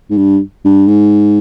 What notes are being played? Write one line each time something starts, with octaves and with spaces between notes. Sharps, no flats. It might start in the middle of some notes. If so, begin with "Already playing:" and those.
G#2
G2
G2
G#2